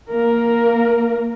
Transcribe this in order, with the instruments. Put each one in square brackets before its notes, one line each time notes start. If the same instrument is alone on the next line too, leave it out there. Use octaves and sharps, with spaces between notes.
[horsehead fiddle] A#3 A#4